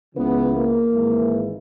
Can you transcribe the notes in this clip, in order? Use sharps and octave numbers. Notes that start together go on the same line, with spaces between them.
C#2 C#3 E3 B3
A#3
G#1 G#2 E3